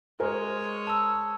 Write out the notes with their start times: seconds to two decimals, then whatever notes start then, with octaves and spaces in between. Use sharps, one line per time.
0.20 G#3 A#4 C5 C#5 G#5
0.87 A5 E6